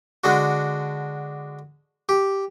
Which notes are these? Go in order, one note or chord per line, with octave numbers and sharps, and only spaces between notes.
D3 G#3 D4 F#4
G4